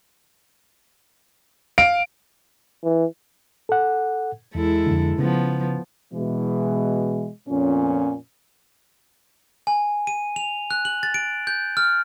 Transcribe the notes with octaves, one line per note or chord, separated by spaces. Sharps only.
F5 D7
E3
A4 F#5
E2 G#3 E4 A4
F2 D3
C#3 F3 B3
B2 E3 G#3
F2 A#2 B3 C#4
G#5
D#7
F7
F#6
F#7
A6
D7
G6
F6